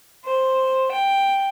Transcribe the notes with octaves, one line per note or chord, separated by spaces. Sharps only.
C5
G5